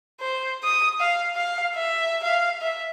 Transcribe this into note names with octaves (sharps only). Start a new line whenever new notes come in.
C5
D#6
F5
F5
E5
F5
E5